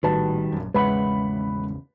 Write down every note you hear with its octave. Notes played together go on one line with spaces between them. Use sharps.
A#1 A2 D#3 G3 F#4 B4 A5
A#1 F#2
G#1 E2 C#3 G#3 B4 E5 F#5 B5